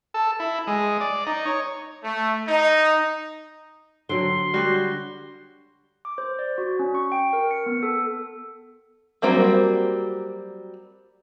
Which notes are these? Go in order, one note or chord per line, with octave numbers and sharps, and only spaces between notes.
A4
E4
G#3
D5
D#4
C#5
A3
D#4
D3 F#3 G5 C6
G3 F#4
D6
C5
D5
F#4
C#4
C#6
G5
A#4
C#7
B3
A4
F#3 G3 A#3 C4 F#4